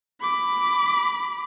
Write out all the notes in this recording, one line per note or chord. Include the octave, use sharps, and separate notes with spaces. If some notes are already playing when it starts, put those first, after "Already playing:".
B5 D6